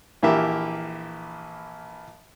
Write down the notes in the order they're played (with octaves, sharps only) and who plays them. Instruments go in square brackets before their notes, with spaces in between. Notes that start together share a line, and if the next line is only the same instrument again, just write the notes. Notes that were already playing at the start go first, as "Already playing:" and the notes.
[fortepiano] A#1 E3 A#3 G4 E5